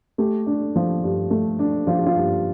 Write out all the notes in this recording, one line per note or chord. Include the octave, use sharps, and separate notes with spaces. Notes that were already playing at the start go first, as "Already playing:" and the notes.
A3 G4
D4
F3
G2
A3
D4
F3 F4
G4
F4
G2